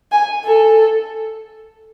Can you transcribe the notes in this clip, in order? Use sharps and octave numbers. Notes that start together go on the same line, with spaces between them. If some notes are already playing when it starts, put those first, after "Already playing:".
G#5
A4